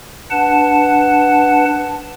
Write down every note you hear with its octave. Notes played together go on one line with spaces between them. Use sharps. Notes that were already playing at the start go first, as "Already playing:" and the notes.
D4 B4 F#5 A5